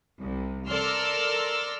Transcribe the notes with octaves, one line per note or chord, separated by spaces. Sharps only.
C2
A4 A#4 D5 C6 E6 F6